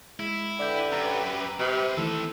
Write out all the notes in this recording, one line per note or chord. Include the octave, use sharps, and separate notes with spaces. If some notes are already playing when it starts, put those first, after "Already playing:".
G#3 E4
D3 G4 B4 D5 E5 G6
F#2 A#5 E6
C3 C4 B5
D#3 E3 A3 A4